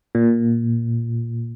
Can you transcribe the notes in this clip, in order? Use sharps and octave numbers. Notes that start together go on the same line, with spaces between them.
A#2